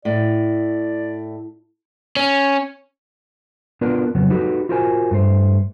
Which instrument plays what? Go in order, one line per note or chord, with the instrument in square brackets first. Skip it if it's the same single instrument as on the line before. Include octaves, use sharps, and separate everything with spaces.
[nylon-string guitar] A2 [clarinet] D5
[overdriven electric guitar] C#4
[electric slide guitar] B3 D4 F4 A#4 B4
F2 C#3 F#3 B3
D#4 F#4 G4 A4 B4
F4 F#4 A#4 C5 G5 G#5
G2 A3 C5